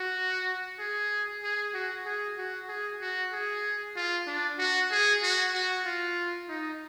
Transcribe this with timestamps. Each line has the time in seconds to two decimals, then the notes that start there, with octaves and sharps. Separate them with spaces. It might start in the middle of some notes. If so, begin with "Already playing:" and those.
Already playing: F#4
0.79 G#4
1.43 G#4
1.74 F#4
2.05 G#4
2.37 F#4
2.68 G#4
3.01 F#4
3.33 G#4
3.96 F4
4.27 D4
4.58 F#4
4.91 G#4
5.22 F#4
5.55 F#4
5.85 F4
6.49 D#4